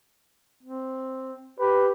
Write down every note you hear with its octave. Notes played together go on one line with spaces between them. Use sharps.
C4
G4 B4